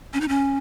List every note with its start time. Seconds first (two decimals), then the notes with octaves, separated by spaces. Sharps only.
0.13 C#4
0.21 D#4
0.28 C#4